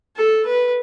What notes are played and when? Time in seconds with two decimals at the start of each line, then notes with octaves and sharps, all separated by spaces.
0.16 A4
0.46 B4